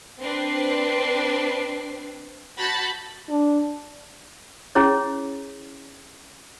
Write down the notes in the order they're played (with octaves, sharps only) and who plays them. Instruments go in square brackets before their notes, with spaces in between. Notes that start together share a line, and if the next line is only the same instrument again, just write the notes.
[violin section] C4 D4 B4 C7
F#4 A5 B5 G6 A6
[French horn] D4
[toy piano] C#4 E4 G#4 C#5